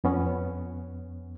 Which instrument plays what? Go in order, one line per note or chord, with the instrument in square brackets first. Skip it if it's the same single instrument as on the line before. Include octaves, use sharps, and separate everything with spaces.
[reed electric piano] F2 B3 C#4